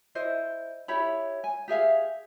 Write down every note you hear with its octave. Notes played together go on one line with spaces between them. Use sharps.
E4 C5 D#5
E4 G4 C#5 B5
G#5
G4 G#4 E5 F5